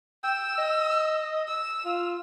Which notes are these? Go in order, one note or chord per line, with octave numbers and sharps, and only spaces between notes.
G5 E6
D#5
E6
F4